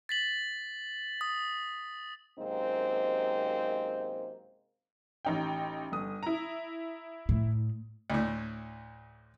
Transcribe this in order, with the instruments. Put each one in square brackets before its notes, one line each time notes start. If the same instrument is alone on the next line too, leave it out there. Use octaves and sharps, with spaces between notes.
[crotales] A6 B6 F#7
D#6
[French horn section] F#2 C3 G#3 A#3 C4 D#4
[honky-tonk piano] A1 D#4 G5
G1 D#6
E4 A#5
[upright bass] A2
[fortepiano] D2 A2